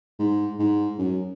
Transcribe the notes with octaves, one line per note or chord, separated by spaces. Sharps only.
G#2
G#2
F#2